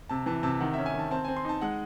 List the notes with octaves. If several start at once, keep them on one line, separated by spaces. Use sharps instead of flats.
C3 A5
E3 A5
C3 A5
D#3 F#5
E5
C#4
G#5
D#3
A5
C4 A5
C4 G#5
C6
D#4 A5
G#3 F#5